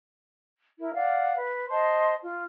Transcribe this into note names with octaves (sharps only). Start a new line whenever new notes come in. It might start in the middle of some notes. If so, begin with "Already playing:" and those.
E4 A#4
D5 F5 F#5
B4
C5 D#5 A5 C6
F4